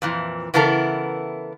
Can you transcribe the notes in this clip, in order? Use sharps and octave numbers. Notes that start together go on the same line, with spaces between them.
F2 A#2 E3
C#3 E3 B3 E4 A4 A#4